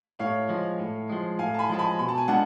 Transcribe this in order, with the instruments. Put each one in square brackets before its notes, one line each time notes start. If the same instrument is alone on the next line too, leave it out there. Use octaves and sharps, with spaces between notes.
[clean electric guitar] A2 [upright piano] C#5 F5
[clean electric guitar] F3 G#3
A2
F3 G#3
[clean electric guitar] A2 [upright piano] F5 G#5
[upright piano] A5
G#5 B5
[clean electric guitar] F3 G#3 [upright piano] A5
[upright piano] G#5 B5
[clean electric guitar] B2 [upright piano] B5
[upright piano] A5
G#5
[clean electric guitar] G#3 B3 D4 F4 [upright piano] F#5 A5